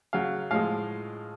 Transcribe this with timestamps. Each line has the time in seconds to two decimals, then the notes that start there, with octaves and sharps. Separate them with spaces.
0.13 C#3 F#3 F5
0.51 A2 F3 G#3 F5